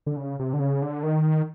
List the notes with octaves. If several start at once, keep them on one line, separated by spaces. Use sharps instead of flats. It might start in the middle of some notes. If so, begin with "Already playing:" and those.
D3
C#3
C3
D3
C#3
D3
D#3